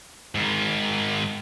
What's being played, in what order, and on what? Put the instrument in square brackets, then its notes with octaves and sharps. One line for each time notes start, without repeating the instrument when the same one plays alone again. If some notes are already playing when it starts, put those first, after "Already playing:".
[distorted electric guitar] G#2 D#3